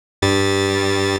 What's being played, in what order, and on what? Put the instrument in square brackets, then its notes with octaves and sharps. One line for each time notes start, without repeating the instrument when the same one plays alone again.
[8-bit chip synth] G2 G3 A6